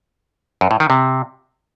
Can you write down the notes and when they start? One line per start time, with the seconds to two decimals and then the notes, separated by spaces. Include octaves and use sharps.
0.61 F#2
0.71 A2
0.80 D#3
0.90 C3